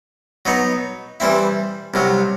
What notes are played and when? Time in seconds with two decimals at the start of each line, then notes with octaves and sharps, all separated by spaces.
0.45 F#3 B3 D#4
1.20 E3 G3 C4 E4
1.94 C2 C3 F#3